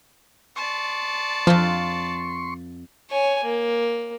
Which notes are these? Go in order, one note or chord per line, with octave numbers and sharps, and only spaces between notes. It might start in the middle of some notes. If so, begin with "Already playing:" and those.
D5 A5 C6 C#6
F2 F3 F4
C#5 G#5
A#3